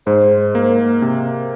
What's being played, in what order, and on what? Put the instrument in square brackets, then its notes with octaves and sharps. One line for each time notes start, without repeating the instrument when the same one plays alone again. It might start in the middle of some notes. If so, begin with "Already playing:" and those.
[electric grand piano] G#2 [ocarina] C5
[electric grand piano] A#3
C3